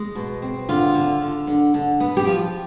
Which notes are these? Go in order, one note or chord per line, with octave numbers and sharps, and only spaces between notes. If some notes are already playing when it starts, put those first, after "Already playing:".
Already playing: G#3
B2
C4
D3 F4
D3
D3
D3
D3
B3
G4
F3 F4